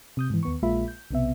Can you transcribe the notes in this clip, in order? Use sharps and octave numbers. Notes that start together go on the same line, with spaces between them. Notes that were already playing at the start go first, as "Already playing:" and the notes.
C3 D#6 G6
G#2 E3
D#2 B3 C#6
A#1 G#3 A#3 F4 E5 B5
G6
B1 C3 B3 E5